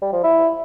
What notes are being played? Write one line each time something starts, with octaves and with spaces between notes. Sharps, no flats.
G3
F3
E4